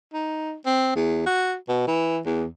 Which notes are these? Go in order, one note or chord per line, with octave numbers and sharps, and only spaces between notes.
D#4
C4
E2
F#4
B2
E3
E2